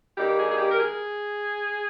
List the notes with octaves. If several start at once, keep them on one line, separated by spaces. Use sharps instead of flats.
G2 D#3 G3 A#3 G4
G#4
G#4
G4
A#4
G#4